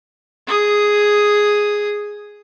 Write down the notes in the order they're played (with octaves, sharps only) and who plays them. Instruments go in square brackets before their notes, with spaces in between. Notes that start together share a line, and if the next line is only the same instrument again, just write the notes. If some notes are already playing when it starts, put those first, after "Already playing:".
[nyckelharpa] G#4 D#6